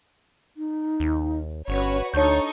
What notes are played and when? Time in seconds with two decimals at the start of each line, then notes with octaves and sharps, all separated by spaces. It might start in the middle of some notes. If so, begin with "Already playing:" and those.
0.57 D#4
1.00 D#2
1.68 G1 C#4 F#4 B4 C#5
2.14 D2 D4 D#4 A4 C#5 C#6 G6